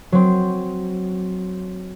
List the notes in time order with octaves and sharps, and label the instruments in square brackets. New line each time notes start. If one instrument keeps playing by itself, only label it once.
[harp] F#3 C4